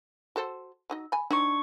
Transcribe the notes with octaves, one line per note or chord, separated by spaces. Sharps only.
F#4 A4 C5
F#3 D#4 D#5
G#5 B5
C4 D4 D#4 C#6